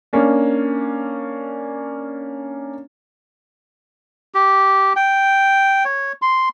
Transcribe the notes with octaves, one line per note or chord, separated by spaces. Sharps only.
A#3 C#4 D4
G4
G5
C#5
C6